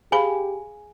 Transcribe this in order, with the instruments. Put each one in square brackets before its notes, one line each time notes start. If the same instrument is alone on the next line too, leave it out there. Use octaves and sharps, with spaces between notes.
[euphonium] G4 [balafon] G#4 F5 B5 [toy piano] G#5